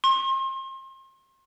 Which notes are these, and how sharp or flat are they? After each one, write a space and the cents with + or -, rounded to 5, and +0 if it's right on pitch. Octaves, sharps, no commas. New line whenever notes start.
C6 +35